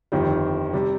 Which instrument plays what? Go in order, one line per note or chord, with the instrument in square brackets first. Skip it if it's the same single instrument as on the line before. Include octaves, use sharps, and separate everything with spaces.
[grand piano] G1 F2 D#3 G3
C3 G3